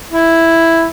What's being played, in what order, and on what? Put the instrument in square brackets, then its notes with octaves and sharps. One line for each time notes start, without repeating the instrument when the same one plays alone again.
[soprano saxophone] E4